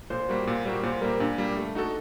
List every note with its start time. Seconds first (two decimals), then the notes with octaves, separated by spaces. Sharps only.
0.10 A#2 C5
0.29 G3 A#3 F#4
0.47 A#2
0.65 G3 A#3 F#4
0.83 A#2 C5
1.01 G3 A#3 A#4
1.20 A#2 D4
1.38 G3 A#3
1.56 A3
1.75 D#4 F#4 A4